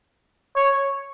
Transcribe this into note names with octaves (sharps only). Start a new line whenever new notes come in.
C#5